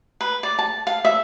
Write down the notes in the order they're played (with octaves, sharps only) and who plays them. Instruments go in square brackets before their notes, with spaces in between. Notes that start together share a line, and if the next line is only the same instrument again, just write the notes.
[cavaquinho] B4
D5
A5
F5
E5